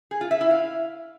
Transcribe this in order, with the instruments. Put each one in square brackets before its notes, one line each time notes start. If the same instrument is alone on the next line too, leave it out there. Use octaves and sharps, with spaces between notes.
[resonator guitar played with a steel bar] G#4
F4
E5
E4
F5